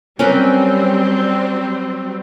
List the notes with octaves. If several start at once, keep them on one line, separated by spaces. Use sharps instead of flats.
F#3 G3 C4 C#4 A#4 B4